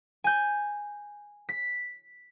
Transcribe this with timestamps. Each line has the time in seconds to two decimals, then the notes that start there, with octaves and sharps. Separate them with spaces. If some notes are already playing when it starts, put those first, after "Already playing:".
0.24 G#5 G6
1.49 B6